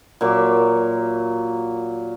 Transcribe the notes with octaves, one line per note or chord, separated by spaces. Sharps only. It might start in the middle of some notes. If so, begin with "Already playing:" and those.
A#2 F#3 E5 D6